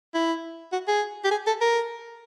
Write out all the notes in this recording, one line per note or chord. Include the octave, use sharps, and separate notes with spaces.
E4
F#4
G#4
G4
G#4
A4
A#4